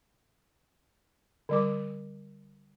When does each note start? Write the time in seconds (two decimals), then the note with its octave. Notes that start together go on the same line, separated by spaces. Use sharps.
1.49 D3 G3 D6